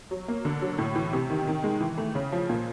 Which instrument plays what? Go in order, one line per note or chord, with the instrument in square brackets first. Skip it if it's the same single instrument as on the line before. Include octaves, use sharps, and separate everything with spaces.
[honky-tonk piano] F#3
A#3
D3
F#3
A2
E3
C3
D#3
D#3
G#3
E3
A3
C#3
F3
A#2